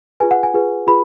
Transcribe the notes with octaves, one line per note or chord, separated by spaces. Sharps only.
F4 G#4 B4 G#5
F#5
G#5
F4 G#4 B4
F4 G#4 B4 B5